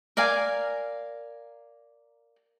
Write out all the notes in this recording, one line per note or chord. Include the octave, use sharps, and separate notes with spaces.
A#4 D5 F5 G#5